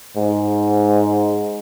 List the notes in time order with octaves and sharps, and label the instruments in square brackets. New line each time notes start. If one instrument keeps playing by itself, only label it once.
[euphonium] G#2